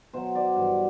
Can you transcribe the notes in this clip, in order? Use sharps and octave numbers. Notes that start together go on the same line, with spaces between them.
B2 F#3 C5
D5
G2 E3